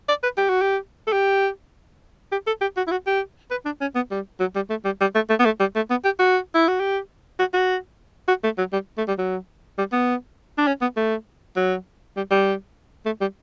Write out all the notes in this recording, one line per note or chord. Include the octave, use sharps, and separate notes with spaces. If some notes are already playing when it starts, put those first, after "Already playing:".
D5
B4
G4
F#4
G4
A4
G4
G4
A4
G4
F#4
E4
F#4
G4
B4
D4
C#4
B3
G3
F#3
G3
A3
G3
G3
A3
A3
B3
A3
G3
A3
B3
G4
F#4
E4
F#4
G4
F#4
F#4
F#4
A3
F#3
G3
A3
G3
F#3
G3
B3
D4
C#4
B3
A3
F#3
G3
G3
A3
G3